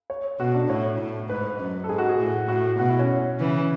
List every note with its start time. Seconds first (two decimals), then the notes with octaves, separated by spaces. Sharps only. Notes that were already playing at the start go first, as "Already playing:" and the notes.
0.10 C#5
0.39 B2 F#4
0.54 D4
0.69 A2 C#5
0.99 A2
1.29 G#2 B4
1.59 F#2
1.84 A4
1.89 G#2 G#4
1.98 F#4
2.09 G#4
2.19 A2
2.48 A2 F#4
2.79 B2 F#4
2.89 E4
2.99 C#4
3.39 C#3 E3